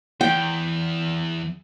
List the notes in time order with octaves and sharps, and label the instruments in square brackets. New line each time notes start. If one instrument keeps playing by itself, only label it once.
[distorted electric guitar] E2 [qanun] G5